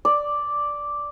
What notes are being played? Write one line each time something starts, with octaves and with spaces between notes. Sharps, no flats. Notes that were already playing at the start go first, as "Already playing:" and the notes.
D5